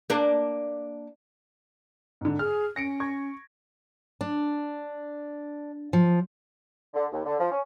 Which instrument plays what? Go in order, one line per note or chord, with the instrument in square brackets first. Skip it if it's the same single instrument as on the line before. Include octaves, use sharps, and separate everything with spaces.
[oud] A#3 D4
[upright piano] G#2 D3
[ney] G#4 [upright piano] F6
[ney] C#4 [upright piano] A#6 C#7 D7
[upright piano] C#6 G#6
[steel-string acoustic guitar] D4
F3
[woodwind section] D3
D#2
D3
F3
C#4